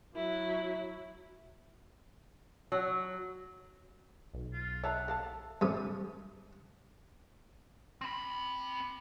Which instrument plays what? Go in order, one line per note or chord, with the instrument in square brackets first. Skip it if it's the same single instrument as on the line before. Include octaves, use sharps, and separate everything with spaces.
[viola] F#3 E4
[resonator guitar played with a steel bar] F#3
[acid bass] B1
[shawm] F4
[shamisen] C#5 A5 A#5 [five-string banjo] E5 [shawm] F#5
[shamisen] A4 F5 A5
[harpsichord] G2 C3 D#6
[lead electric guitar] C4 B5